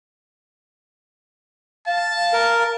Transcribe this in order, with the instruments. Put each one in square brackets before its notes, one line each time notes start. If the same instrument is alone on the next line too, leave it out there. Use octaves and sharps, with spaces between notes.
[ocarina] F5 [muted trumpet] A5
[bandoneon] A#4